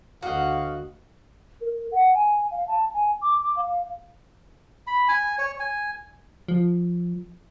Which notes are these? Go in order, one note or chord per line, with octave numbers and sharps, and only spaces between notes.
D2 F#4 D#5 F5 F#5
A#4
F#5
G#5
F5
A5
G#5
D6
D6
F5
B5
G#5
C#5
G#5
F3